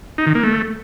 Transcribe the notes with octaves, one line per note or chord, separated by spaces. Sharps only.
D#4
D#3
A#3
A3